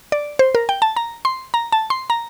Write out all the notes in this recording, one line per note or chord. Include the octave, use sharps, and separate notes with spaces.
D5
C5
A#4
G5
A5
A#5
C6
A#5
A5
C6
A#5